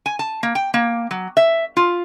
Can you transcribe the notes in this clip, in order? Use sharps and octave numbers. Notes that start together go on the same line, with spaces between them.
G#5
A5
A#3
G5
A#3
F#3
E5
F4